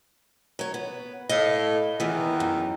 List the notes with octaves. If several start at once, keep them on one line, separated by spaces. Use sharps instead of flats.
F#3 C#5
B3
A2 D#5 F5
E2 D#3 E3 B3
F#2